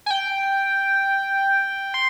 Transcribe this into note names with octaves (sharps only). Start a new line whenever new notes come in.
G#5
G5
C6